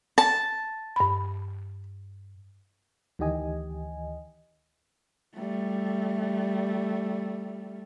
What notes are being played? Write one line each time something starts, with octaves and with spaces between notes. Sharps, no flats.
A5
G2 B5
D2 D#3 E3 G4 D#5 G#5
G3 A3